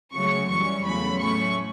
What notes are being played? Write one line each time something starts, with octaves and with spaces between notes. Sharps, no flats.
C#3 F#3 A3 C#4 C#6
F#2 E3 G3 C#4 C#6
E2 C#3 F#3 A3 C#4 B5
A2 F#3 A3 C#4 C#6